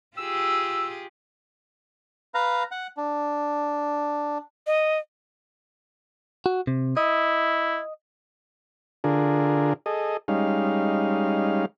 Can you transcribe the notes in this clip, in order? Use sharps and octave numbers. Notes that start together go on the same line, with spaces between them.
F4 G4 G#4 E6
B4 F5 A#5
F#5
D4
D#5
F#4
C3
E4 D#5
D3 D4 F4 G#4 A#4
G#4 A4 D#5
G3 G#3 C#4 D#4 F5